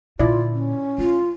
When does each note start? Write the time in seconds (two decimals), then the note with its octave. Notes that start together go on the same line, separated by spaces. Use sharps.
0.19 A#2 D3 E4 F4 D5
0.52 C#4
0.98 A3 F4